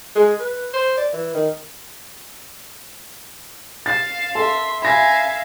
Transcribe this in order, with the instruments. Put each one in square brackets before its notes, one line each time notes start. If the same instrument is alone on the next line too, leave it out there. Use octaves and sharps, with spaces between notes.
[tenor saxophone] G#3
B4
C5
D5
E3
D#3
[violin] F5 E7 [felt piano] A6
[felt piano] A4 [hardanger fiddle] E5 C6
[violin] E5 F5 [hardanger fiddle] G#5 [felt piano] B5 A#6